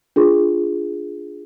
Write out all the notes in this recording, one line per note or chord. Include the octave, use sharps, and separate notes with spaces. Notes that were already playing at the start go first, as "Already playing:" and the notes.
D4 F4 G#4